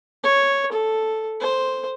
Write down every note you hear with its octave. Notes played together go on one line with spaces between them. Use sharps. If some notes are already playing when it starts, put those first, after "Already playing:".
C#5
A4
C5